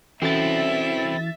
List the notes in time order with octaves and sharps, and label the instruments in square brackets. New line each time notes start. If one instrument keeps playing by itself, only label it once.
[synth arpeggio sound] E3 A6 [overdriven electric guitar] C4 E4 [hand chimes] C#4 F#4 A4 [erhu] E5